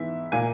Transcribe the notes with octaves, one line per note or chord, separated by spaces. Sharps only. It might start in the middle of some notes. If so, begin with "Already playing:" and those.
Already playing: G#2 E3 B3 E5
A#2 A#3 G#5